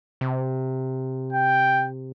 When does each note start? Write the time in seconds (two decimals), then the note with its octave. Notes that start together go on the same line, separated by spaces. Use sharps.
0.21 C3
1.33 G5